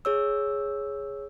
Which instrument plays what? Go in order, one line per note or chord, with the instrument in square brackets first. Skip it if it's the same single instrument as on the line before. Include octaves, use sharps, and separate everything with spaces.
[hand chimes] G#4 C#5 E6